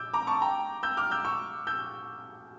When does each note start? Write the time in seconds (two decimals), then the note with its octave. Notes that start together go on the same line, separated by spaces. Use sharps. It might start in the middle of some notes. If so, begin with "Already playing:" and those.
Already playing: D6 E6 G6
0.14 A#5 D6
0.27 A5 C#6
0.42 G5 A#5
0.83 E6 G6
0.97 D6 F6
1.11 E6 G6
1.25 C#6 E6
1.67 E6 G6